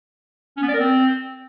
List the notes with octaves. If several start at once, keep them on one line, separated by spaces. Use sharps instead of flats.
C#4
B3
D5
A#4
C4